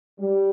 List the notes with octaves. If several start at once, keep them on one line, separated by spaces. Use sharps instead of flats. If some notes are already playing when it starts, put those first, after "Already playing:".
G3